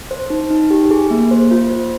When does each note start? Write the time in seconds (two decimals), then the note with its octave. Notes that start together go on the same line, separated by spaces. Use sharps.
0.11 C5
0.30 D#4
0.51 D#4
0.70 G4
0.91 G#4
1.10 A#3
1.31 C5
1.51 F4
1.70 C5